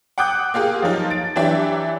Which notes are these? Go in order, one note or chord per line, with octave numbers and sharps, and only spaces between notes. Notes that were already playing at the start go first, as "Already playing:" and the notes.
F#5 G5 D6 D#6 F#6 G6
A#3 F4 G4 G#4
F3 F#3 D#4 F4
A6 D7
E3 F#3 D4 G4 D5 E5